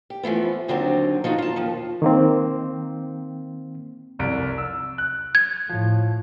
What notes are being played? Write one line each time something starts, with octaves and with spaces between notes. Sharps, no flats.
G4
E3 F3 A3 B3
D#2 D3 F#3 C4 D4 D#4
F3 D#4 F4 F#4
F4 A5
D#2 F3
D#3 A#3 C4
F1 C2 D7
E6
F#6
G#6
A2 F3